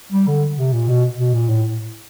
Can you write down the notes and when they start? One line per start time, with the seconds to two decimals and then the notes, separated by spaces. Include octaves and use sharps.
0.12 G3
0.27 D3
0.57 C3
0.73 A#2
0.88 B2
1.18 B2
1.34 A#2
1.49 A2